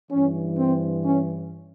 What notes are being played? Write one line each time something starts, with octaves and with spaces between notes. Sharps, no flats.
G2 E3 C#4
C4
C#4